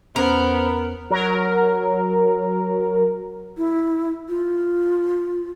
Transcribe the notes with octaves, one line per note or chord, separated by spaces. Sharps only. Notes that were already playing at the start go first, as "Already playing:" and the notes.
E2 B3 C#4 A#4 C5
F#3 A#4
E4
F4